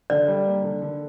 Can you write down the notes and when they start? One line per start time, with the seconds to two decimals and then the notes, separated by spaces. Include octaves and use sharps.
0.10 D3 D5
0.28 G3
0.46 A#3
0.64 D3
0.82 D3